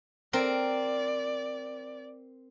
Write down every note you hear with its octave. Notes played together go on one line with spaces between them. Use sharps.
C4 A#4 D5